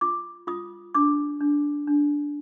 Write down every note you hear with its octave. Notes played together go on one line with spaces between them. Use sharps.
F4 D6
F4 D#6
D4 D6
D4
D4